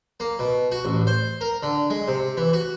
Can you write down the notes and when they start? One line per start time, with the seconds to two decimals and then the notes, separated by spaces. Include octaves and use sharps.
0.20 A#3
0.39 B2
0.72 F#4
0.85 A1
1.07 C5
1.41 A#4
1.63 D3
1.90 G#3
2.08 C3
2.37 E3
2.53 F#4